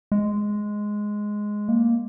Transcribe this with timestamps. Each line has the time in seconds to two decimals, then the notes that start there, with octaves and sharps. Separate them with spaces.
0.12 G#3
1.68 A#3